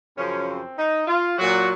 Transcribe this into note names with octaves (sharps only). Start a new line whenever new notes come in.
F#2 C#3 F3 C#4
C4
D#4
F4
A#2 F#3 F#4